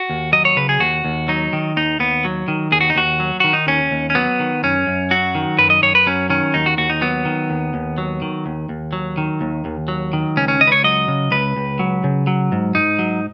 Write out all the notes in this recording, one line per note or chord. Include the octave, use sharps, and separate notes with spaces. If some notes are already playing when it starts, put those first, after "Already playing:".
Already playing: F#4
D#2
F#3 D#5
C#5
C#3 B4
G#4
D#2 F#4
D#2
F#3 D#4
D#3
D#2 D#4
D#2 B3
F#3
D#3
D#2 G#4
F#4
D#4
D#2 F#4
F#3
D#3 F#4
D#4
D#2 C#4
D#2
C#4
F#3 B3
D#3
F#2 C#4
F#2
F#3 F#4
D#3
F#2 B4
D#5
F#2 C#5
B4
F#3 C#4
D#3 C#4
D#2 D#4
F#4
D#2 F#4
D#4
F#3 B3
D#3
D#2
D#2
F#3
D#3
D#2
D#2
F#3
D#3
D#2
D#2
F#3
D#3
C#2 C#4
C#4
C#2 D#5
B4
C#5
F#3 D#5
C#3
C#2 B4
C#2
F#3
C#3
F#3
G#2
G#2 D#4
F#3